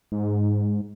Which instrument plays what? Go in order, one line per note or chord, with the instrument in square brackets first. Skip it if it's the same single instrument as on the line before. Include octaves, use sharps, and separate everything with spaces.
[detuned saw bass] G#2